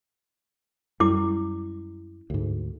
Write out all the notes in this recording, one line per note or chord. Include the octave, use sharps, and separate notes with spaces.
F#2 G3 E4 D6
D2 G#2